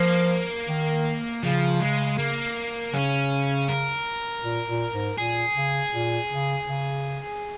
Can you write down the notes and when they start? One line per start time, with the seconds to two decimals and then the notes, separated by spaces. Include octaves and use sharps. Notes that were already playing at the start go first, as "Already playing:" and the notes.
Already playing: F3 A#3
0.68 D#3
1.43 C#3 F3
1.81 G#3
2.18 A#3
2.94 C#3 C#4
3.69 A#4
4.43 A#2
4.68 A#2
4.94 G#2
5.18 A#2 G#4
5.56 C#3
5.93 A#2
6.31 C#3
6.68 C#3